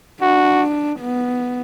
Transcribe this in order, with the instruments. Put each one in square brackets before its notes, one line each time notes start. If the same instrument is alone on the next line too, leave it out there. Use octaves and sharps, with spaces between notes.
[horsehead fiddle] D4 [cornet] F#4
[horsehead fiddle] B3